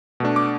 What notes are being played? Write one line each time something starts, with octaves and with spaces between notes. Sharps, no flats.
B2 A3 D4
D6